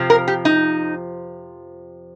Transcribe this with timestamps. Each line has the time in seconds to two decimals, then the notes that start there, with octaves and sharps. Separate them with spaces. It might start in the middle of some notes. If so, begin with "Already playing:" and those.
Already playing: F2 C3 F3
0.10 A#4
0.28 G4
0.45 D#4